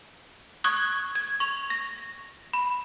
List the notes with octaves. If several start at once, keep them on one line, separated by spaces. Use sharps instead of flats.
C#6 D#6 F#6 G#6
G#6
C#6 F7
A#6
B5